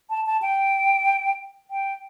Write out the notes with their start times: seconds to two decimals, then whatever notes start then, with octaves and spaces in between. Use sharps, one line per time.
0.10 A5
0.26 A5
0.42 G5
1.71 G5